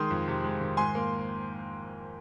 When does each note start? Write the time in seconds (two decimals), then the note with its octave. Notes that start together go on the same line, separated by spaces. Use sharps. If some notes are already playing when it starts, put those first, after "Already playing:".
Already playing: D#3 G#3 C6 D#6
0.10 F2
0.28 C3
0.44 G#3
0.61 D#3
0.77 G#2 G#5 C6
0.95 A#3